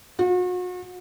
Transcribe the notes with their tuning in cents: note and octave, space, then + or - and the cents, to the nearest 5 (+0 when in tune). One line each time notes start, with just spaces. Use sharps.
F#4 -40